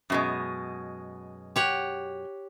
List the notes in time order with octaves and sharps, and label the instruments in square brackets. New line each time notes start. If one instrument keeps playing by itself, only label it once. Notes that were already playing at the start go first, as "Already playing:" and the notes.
[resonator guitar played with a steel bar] F#2 B2 G#3
[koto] G4 C#5 F#5